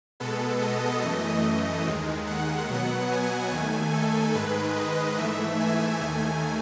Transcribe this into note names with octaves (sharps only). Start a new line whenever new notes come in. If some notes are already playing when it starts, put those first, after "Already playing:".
B2 G#3 B3 A4
D#5
F#2 E3 A3
D#2 D#3 G#3
F#5
B2 F#3 B3
G#5
D#2 D#3 A3
A4
G#2 D#3 G#3 B4
D#5
G#2 E3 A3 E5
G#5
D#2 D#3 A3